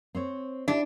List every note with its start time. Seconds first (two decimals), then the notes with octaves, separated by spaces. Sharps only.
0.15 C4 C5 C#5
0.68 D4 E4 G4